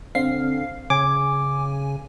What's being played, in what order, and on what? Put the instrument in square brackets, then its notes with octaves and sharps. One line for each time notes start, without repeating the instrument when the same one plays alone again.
[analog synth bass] D3 [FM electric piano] C4 F5 C7
[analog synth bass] C#3 [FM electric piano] G#5 [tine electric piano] D6